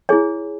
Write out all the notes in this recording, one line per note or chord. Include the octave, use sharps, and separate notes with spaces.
E4 G#4 C#5 G#5